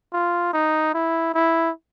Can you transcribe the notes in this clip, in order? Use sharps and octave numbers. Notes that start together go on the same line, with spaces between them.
F4
D#4
E4
E4